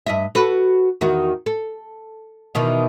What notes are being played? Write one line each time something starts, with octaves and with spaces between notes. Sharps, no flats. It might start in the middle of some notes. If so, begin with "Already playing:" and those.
G2 D#5 E5
F#4 A4 B4
E2 D#3 F#4
A4
B2 D#3 E3